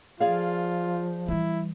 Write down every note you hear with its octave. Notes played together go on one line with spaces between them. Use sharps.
F3 F4 G#4 D5 F5
E3 G3 E4